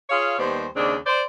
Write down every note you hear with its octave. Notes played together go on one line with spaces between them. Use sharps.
F4 G#4 C#5 F5
D#2 G3 B3 C5
D#2 C#3 C4 D4
C5 D5